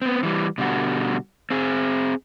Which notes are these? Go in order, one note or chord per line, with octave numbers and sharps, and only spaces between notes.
B3 C4
E3 G3
B2 D3 G3 F#4
C4 G#4